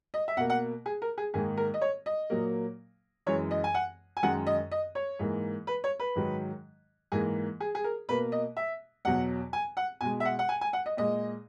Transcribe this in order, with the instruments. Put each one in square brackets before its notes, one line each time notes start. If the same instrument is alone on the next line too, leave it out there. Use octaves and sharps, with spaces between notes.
[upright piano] D#5
E5
B2 F#5
A#3
F#5
G#4
A#4
G#4
G#2 D#3 A#3 G#4
A#4
D#5
C#5
D#5
A#2 F#3 A#3
F#2 E3 G#3 C#5
D#5
G#5
F#5
G#5
F#2 D#3 G#3 F#5
D#5
D#5
C#5
G#2 E3 A#3
B4
C#5
B4
G#2 D#3 F#3
G#2 E3 A#3 G#4
G#4
G#4
A#4
B2 A#3 B4
D#5
E5
E2 B2 F#3 F#5
G#5
F#5
B2 G#3 G#5
E5
F#5
F#5
G#5
G#5
F#5
D#5
A#2 G#3 D#5